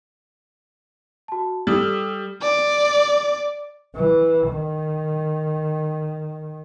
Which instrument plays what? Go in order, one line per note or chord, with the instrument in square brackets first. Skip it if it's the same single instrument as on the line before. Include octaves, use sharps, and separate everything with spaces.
[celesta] F#4 A5
[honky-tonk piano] G3 [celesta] A4 D#6 E6
[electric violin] D5
[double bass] E3
D#3